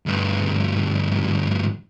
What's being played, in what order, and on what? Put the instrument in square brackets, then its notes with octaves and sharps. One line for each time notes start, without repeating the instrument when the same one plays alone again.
[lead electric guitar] D2 G2